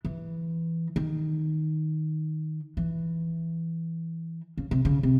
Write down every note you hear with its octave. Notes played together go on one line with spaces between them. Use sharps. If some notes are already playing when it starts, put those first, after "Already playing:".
E3
D#3
E3
C#3
C3
C#3
C3